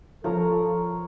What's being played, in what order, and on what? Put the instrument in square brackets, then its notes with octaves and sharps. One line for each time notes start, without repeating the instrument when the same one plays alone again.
[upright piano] F3 [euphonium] A4 [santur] A#4 C#5 A#5